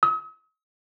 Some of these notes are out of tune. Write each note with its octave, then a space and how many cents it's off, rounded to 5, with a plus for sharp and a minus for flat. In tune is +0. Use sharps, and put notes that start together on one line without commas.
D#6 +45